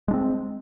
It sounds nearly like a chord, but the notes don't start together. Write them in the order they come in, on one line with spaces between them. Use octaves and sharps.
G#3 D4 C4